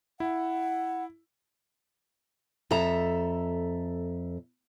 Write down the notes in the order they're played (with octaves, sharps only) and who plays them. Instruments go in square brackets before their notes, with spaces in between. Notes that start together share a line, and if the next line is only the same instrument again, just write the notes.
[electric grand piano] E4 [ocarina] F#5
[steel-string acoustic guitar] F2 A4 E5 A#5